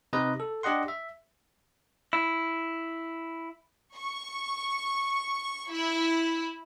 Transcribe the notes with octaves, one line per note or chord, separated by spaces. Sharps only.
C3 D#4 B4 D#5
A4
D4 G4 D#5 F#5 C6
E5
E4
C#6
E4